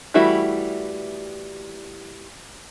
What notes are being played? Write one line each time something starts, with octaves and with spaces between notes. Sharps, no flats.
E3 G3 A3 E4 F#4